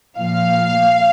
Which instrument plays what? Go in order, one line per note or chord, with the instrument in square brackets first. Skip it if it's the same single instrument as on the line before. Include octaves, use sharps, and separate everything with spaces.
[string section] A#2 F3 F5